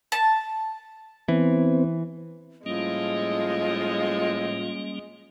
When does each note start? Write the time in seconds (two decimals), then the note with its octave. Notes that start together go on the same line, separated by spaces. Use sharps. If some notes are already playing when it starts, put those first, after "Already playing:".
0.12 A5
1.28 E3 B3 C4
2.66 A2 F3 G3 G#3 A#3 C#4 F4 D#5